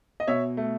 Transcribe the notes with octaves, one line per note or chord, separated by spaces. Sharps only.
D#5
B2 C#5 E5
A3